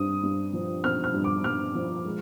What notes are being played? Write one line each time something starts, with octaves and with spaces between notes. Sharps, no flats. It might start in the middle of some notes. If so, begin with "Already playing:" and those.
Already playing: G2 C4 D#6
G2
F3
C4 F6
F6
G2
D6
G2 F6
F3
G#3